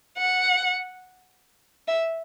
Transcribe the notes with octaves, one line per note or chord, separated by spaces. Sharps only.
F#5
E5